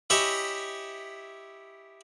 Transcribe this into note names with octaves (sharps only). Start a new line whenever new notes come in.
E4 G4 C#5 D#5 E5 G#5